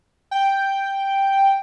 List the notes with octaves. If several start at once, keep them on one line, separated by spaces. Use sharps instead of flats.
G5